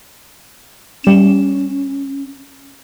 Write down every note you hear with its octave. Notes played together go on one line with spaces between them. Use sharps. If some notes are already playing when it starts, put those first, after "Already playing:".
G3 C#4 E7